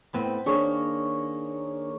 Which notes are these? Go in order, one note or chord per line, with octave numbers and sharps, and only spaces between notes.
A2 B3 C4
D#3 A#3 D4 G#4 C#5